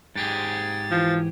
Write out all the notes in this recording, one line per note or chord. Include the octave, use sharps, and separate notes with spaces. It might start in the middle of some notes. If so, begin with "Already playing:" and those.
G#2 G4 G#4 A6
E3 F3